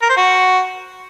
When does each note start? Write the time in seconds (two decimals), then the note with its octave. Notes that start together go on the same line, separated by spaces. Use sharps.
0.02 A#4
0.09 C5
0.17 F#4